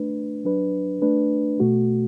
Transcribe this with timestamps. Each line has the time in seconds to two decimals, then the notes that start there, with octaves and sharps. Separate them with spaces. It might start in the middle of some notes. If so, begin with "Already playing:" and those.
Already playing: A3 D4 B4
0.45 F#3 D4 B4
1.02 A3 D4 B4
1.60 B2 A3 F#4